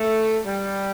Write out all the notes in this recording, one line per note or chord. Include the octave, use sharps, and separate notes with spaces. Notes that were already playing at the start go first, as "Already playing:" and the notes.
Already playing: A3
G3